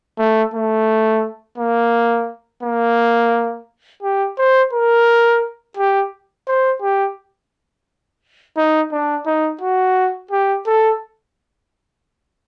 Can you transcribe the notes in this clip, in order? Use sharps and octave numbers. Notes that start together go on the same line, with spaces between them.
A3
A3
A#3
A#3
G4
C5
A#4
G4
C5
G4
D#4
D4
D#4
F#4
G4
A4